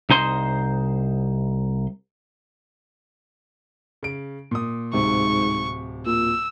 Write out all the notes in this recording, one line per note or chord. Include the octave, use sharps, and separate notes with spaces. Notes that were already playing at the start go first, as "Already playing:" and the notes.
C2 D#4 C5 C6
C#3 D7
A#2 D#6
D1 G#2 C3 C#6
A#2 E6